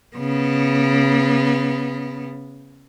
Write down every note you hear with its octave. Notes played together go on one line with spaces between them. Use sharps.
C#3 B3